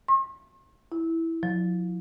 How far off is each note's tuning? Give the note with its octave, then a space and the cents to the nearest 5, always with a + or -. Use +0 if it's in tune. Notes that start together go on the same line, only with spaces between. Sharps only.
C6 +45
E4 -5
F3 +40